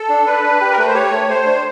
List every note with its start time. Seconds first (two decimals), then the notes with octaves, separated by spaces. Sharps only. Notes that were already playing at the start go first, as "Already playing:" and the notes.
Already playing: A4
0.09 D4
0.26 D4 B4
0.43 D4
0.61 G4
0.71 A#4
0.78 A3 B4
0.87 C5
0.94 G4 C#5
1.11 A3
1.28 A3 C5
1.45 D4